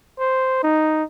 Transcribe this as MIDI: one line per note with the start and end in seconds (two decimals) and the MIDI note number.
0.20 0.60 72
0.63 1.03 63